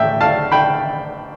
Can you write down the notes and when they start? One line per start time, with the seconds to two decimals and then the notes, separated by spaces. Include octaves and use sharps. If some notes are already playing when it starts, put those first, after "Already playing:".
Already playing: A1 A2 E5 G5
0.21 F5 A5
0.52 G5 B5